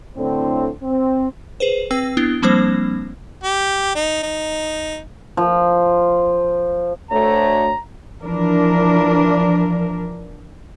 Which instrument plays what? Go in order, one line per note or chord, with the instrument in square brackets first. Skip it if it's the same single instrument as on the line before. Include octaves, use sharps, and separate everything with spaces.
[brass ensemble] A2 D3 C4
C4
[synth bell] G#4 B4 C5
C4 B4 G5 E6 C7
B3 D4 E4 G7
F3 G3 A#3 C4 D4 C5
[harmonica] G4
D#4
D#4
[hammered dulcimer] F3
[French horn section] D2 A3 C#5 [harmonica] A#5
[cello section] E3 F3 D4 A#4